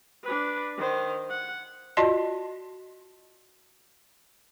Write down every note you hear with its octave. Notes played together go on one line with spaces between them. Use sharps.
D4 B4
D#3 C5
F#5
F4 F#4 D5 D#5 A5 C6